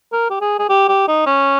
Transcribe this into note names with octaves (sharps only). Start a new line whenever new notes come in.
A#4
G4
G#4
G#4
G4
G4
D#4
C#4